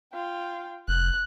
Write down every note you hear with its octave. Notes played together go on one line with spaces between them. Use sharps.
F4 G5
F1 F#6